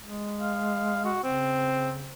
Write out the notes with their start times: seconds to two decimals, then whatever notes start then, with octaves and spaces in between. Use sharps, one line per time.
0.02 G#3
0.41 F5
1.05 F#4
1.24 C#3 C4